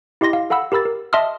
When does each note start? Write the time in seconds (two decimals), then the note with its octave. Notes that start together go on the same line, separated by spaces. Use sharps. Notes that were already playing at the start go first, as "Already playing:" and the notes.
0.21 E4 G4 D#5 C6 A#6
0.33 F5
0.50 A4 F5 F#5 B5 E6
0.72 G4 A#4 B5 E6 A6
0.85 A#4
1.13 D#5 E5 A5 C6 D#6 F6